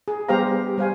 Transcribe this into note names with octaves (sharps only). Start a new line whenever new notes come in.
G#4
G3 B3 G4 C5 F5 A#5
G3 C5 F5 G#5